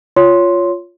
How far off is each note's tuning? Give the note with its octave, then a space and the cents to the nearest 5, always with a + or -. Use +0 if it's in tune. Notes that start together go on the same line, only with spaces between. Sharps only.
F4 +0 C#5 +10 C6 +0